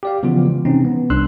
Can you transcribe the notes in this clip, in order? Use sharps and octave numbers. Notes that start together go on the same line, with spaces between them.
G4 D5 F5
C#3 E3 F3 B3 F4
G#3
C3 E3 C4 C#4 D#4
B3
C2 D4 C6 E6 F#6